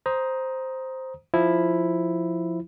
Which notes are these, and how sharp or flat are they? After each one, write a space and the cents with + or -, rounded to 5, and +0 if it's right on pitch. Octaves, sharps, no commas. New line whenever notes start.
C5 +0 A#5 +15 D#6 +10
F3 +0 E4 +0